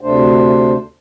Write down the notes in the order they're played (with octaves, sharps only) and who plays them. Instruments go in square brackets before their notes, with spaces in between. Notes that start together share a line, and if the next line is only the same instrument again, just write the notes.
[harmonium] D2 C3 A3 D4 C5